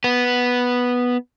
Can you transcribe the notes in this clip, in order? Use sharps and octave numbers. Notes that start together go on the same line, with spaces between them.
B3